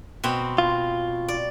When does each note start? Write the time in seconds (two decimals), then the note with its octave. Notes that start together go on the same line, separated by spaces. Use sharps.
0.24 B2 C4 B5
0.58 F4
1.28 D5